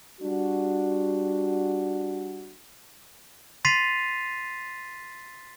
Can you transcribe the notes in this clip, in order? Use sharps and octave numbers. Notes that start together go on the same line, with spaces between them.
G3 D4 F#4
C6 A6 B6 C7 D#7 F7